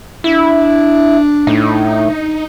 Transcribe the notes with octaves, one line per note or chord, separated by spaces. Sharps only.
D4 E4
A2 D#4